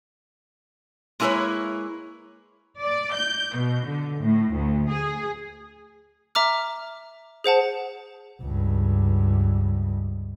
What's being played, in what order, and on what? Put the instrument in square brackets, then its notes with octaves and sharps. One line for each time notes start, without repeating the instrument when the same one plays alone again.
[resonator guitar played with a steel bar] G#3 A#3 E4 A#4 B4 C#5
[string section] D5
G6
B2
D3
A2
D2
G#4
[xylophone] E5 A#5 D6 F6
G#4 C5 F#5 A5
[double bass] C#2 G2